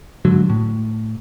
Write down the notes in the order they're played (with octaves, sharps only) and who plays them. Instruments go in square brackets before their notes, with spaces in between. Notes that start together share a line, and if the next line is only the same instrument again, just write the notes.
[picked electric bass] G#2 D3 F#3
A2